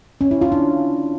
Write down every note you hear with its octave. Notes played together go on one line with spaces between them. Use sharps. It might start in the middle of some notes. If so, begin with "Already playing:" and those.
C#4
E4
F4
D4